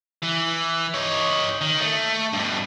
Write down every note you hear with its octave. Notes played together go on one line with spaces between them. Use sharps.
E3
D#4 C#5
D#3
A3
G2 B2